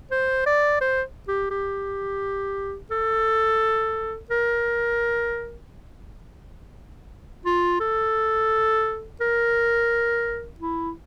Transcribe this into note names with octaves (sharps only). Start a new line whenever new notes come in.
C5
D5
C5
G4
G4
A4
A#4
F4
A4
A#4
E4